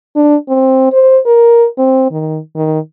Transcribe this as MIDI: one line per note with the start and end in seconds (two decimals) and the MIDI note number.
0.16 0.36 62
0.49 0.89 60
0.93 1.19 72
1.26 1.67 70
1.78 2.09 60
2.11 2.39 51
2.56 2.79 51